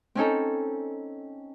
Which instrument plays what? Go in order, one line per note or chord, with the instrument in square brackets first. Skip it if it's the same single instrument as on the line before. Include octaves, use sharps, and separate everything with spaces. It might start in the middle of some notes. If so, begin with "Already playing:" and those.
[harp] C4 C#4 D#4 A4